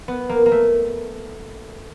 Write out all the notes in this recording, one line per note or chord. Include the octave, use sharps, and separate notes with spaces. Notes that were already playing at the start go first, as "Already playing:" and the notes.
B3
A#3
A#3
A3